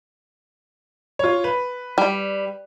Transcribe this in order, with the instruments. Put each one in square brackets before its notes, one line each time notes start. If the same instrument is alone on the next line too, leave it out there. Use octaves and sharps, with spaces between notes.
[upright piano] F4 C#5
B4
[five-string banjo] G3